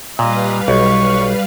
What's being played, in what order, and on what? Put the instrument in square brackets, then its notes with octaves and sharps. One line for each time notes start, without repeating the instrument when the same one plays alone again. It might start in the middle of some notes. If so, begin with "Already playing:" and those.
[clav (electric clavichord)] A#2 [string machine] G3 B4 F5 [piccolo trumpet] D#5
[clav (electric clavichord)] B1 [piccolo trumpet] C#6